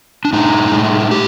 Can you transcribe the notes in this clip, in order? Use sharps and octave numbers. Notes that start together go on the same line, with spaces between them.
D4
A2 D#4
A2
A2 G4